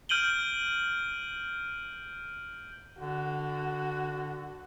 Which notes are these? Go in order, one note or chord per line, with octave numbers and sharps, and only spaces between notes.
F6 G6 D7 D#7 F#7 G7
D3 F#4